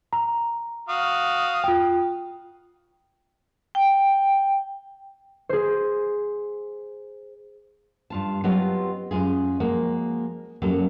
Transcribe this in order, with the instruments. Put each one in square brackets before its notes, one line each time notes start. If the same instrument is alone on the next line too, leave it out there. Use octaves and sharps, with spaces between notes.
[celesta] A#5
[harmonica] F#4 F5 D#6
[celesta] F4 G5
[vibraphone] G5
[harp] G#4 C5
[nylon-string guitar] G2 F4 A5
F#3 B3 C4 F4 G4 D#5
F#2 G#3 F4 G#4
F3 G#3 A#3 F#4
F#2 F#3 A#3 G4 A4